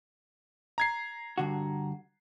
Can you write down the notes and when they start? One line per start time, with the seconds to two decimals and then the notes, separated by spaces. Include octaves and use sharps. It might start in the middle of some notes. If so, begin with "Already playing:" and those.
0.78 A#5 G#6 C7
1.38 G2 D3 F#4